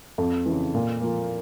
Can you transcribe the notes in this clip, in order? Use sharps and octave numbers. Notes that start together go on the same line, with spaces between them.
F2
C#3 E3
A#2
F3 A#3